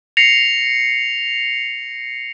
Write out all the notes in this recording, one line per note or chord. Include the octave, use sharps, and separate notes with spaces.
A#6 C7 C#7 F7